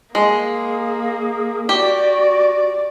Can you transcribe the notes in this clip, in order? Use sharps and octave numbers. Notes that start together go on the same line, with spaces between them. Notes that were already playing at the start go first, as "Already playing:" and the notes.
G#3 A#3 G#4
F#4 G4 D5